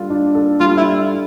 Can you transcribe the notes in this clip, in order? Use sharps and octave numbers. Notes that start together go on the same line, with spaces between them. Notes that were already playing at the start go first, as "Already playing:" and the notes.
Already playing: G3 D4 F4 A4
D4
A4
G3 F4
E4